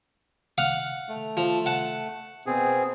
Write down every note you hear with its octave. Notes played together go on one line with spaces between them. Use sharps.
F5 F#5 D#6
A3
F3
F#5 A5
B2 C4 G#4